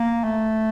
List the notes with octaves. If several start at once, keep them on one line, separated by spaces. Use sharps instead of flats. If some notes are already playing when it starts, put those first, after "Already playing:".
Already playing: A#3
A3